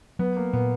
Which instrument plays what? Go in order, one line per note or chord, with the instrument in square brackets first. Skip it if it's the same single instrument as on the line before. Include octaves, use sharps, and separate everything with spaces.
[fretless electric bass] F#3 [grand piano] B3
[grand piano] A#3
[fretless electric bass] A#2 [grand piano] B3